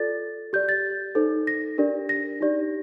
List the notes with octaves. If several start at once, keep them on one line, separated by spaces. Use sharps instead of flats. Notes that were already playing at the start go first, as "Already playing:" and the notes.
Already playing: F4 A4 D5 A6
G4 D5 G6
A6
D#4 A4 C5
A#6
D4 G4 A#4 D5
A#6
D#4 G4 D5